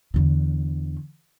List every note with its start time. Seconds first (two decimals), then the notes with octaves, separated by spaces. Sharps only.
0.14 E2 D3